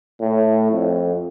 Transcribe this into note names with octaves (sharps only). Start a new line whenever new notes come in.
A2
F2